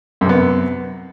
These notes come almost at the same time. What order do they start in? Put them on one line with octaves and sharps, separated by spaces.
F#2 C3 B3